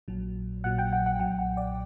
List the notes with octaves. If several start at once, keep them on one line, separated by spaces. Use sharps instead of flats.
A#1 A#2 F#3
A#1 A#2 F#3 F#5
G5
F#5
F#5
B1 A#2 F#3 G5
F#5
D5